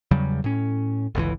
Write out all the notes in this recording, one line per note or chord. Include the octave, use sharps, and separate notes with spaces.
E2 C#3 F#3 G3
A2 C#4
G1 C#2 B2 E3